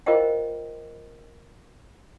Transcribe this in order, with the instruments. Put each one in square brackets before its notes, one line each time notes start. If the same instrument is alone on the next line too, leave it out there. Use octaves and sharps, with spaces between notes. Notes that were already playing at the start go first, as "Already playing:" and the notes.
[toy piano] F4 A#4 C5 D#5 F5 G5